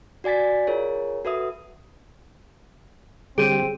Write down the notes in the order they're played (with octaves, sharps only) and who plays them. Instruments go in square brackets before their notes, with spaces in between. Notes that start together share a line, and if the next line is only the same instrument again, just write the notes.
[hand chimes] F#4 D5 G#5 A6 B6
F4 G#4 A#4 C#5
F#4 A4 B4 E5 D#6
[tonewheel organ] D3 G3 G4 [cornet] C4 [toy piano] G#4 C#5 [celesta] D7 D#7